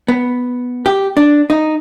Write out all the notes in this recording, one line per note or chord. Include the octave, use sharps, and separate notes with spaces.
B3
G4
D4
D#4